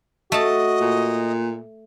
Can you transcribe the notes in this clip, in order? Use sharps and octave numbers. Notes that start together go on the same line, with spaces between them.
A3 F#4 D#5 A5
A#2